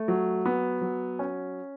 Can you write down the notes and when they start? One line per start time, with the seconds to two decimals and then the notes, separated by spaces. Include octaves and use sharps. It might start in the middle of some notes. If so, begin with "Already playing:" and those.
Already playing: A3
0.08 F#3
0.46 B3
0.81 F#3
1.19 C#4